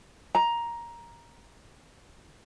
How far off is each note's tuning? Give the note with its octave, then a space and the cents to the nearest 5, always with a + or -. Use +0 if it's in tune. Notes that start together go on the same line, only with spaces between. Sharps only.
A#5 +10